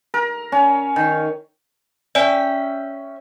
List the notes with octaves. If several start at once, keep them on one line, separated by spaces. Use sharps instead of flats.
A#4
C#4
D#3
C#4 D5 E5 G5 G#5